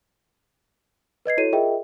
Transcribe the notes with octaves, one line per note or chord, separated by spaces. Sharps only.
B4 D#5 G#6 C7
E4 F#4 A4 C#5 D#7
F4 G#4 A#4 D#5 E5 G5